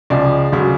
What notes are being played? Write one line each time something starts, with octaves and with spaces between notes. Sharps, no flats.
C#2 C#3 F3 D5
D2 C#3 F#3